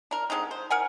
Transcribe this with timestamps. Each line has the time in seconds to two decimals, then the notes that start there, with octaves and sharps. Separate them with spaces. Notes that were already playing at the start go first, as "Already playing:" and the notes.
0.11 D4 A#4
0.30 D3 G#3 C4 D#4
0.51 C5
0.70 A#4 F#5 G#5